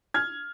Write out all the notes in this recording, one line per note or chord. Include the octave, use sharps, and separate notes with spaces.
F6 G#6